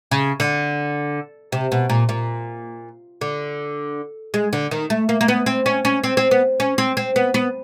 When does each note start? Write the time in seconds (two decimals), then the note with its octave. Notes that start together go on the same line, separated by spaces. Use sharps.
0.11 C#3
0.40 D3
1.52 C3
1.72 B2
1.90 A#2
2.09 A#2
3.21 D3
4.34 G#3
4.53 D3
4.71 D#3
4.90 A3
5.09 A#3
5.21 A#3
5.28 B3
5.46 C4
5.66 C#4
5.85 C#4
6.04 C4
6.17 C4
6.31 B3
6.60 C#4
6.78 C4
6.97 C4
7.16 B3
7.34 B3